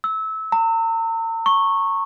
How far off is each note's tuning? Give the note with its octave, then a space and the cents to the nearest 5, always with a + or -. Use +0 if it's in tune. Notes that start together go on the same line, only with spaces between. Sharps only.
E6 -25
A#5 -40
C#6 -10